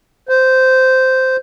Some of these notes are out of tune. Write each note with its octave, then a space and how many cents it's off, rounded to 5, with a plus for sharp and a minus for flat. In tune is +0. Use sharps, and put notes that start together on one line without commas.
C5 -10